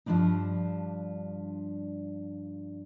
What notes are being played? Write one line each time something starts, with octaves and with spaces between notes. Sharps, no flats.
G2 F3 G3 G#3 D4 D#4